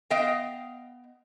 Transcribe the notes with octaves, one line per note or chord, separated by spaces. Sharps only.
B3 D#5 F5 G5